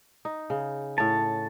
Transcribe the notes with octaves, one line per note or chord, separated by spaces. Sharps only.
D#4
C#3
A2 C#5 A5